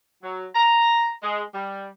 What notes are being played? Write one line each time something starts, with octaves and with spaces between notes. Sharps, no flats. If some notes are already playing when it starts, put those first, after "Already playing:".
F#3
A#5
G#3
G3